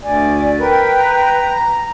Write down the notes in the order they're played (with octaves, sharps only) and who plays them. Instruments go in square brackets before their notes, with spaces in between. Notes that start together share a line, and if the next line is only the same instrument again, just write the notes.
[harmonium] D2 [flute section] D5 G#5
[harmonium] A#4 [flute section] B4 G5
[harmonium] A#5